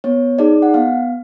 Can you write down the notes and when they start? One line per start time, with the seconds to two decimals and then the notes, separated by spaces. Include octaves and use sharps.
0.04 B3 C#5
0.39 D#4 G#4 D5
0.62 F#5
0.74 B3 F5